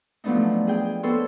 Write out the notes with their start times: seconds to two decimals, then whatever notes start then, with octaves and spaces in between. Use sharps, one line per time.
0.24 F3 F#3 A3 B3 D4 D#4
0.67 G#4 G5
1.03 B3 A4 C5 C#5